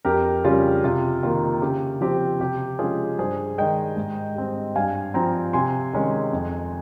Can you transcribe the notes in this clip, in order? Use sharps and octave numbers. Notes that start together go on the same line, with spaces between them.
F2 G4 A#4
C#3 G3 C#4 F4 G#4
C3 F4
D#3 A#3 F4
C#3 G4
F3 C4 G4
C3 G4
F3 G#3 C#4 F4 G#4
G2 G#4 C5
D#3 G#3 D#5 G5
G#2
G3 C4
G2 F5 G#5
F3 C4 G5 A#5
C3 G#5 C6
D#3 G#3 C#4
F2